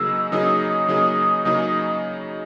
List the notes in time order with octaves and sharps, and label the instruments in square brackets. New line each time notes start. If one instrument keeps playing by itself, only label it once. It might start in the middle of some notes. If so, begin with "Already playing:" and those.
Already playing: [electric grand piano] C#3 F#3 A#3 D#4 G#4 [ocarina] E6
[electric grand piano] C#3 F#3 A#3 D#4 G#4 [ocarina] D#6
[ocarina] D#6
[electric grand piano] C#3 F#3 A#3 D#4 G#4
C#3 F#3 A#3 D#4 G#4